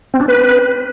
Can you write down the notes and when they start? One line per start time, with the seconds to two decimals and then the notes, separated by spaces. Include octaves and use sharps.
0.14 C4
0.21 D4
0.28 B4